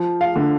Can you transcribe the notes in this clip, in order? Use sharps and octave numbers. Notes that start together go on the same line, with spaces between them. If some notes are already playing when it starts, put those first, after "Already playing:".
Already playing: F3
F5
D3